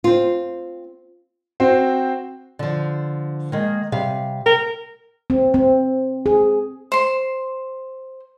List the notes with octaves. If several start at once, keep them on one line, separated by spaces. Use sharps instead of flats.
C4 F4
C4 F#4 C5
D3 F3
D#3 G#3 A#3
C3 G3 F5
A#4 G5
C4
C4
G#4
C5 C6